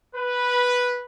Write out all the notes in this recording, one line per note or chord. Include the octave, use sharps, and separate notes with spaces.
B4